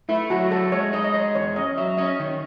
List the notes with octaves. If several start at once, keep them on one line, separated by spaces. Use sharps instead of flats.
A3 E4
F#3 F#4
A3 A4
G#3 C#5
D#4 D#5
D#5
G#3 C#5
E2 C#5
C#4 D#5
F#3 E5
C#4 D#5
D#3